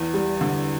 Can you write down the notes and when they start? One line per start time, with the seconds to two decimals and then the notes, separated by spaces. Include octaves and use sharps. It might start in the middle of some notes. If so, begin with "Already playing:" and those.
Already playing: E2
0.14 G3
0.41 D3